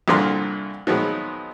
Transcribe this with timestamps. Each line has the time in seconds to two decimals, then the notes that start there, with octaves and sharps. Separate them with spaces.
0.08 C2 A#2 D3 A#5 C6 F6
0.87 D#3 F3 F#3 G#3 B3